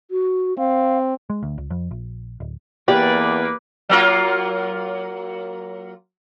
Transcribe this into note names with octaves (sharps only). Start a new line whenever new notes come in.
F#4
C4 F5
G#3
D2
C#2
F2
A#1
D1
E2 A#3 G4 B4 D5
F#3 A#3 F4